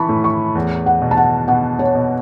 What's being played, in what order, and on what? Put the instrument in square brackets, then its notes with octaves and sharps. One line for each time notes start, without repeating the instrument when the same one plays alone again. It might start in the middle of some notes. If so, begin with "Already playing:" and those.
Already playing: [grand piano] E3 E4 [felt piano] A5 B5 C#6
[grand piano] A2
[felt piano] C#6
[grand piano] E2
[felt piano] F#5
[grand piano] B2
[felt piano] A5
F#5
[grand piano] B2 [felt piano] F#5
[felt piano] C#5
[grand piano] B2